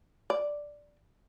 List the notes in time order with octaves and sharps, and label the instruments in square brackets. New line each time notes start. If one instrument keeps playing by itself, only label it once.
[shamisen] D5